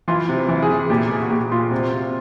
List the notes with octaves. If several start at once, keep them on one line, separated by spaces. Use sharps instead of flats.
E3 F4
C3
E3
G#4
E3
A#2 G4
A#2 G#4
F#4
A#2 G4
A#2 F4
C3
C3